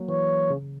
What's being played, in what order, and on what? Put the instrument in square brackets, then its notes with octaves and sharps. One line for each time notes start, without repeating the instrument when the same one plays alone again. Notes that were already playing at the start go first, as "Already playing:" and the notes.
Already playing: [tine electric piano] F#3 A#3
[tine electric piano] E3 [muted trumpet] C#5
[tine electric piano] C#3